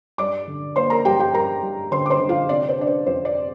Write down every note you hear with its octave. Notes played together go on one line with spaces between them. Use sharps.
G2 D5 D6
D3
A#3 C5 C6
A#4 A#5
G2 G4 G5
G4 G5
G2 A#4 A#5
G2
D3 C5 C6
D6
C5 C6
D3
F4 F5
C3 D5
C5
D4 D5
C5
F2 C5
D5